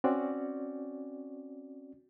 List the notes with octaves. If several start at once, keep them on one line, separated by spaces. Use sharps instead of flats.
C4 C#4 F#4 D5